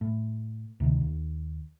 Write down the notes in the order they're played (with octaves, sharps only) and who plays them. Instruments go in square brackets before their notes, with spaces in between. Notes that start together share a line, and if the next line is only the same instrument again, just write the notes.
[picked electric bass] A2
D2 C3 D#3
D#2